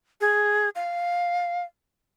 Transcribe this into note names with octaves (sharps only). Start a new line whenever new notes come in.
G#4
F5